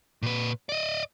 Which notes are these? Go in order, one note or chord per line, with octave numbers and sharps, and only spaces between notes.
A#2 B4
D5 D#5